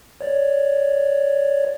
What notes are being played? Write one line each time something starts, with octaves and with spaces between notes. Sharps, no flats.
C#5 D5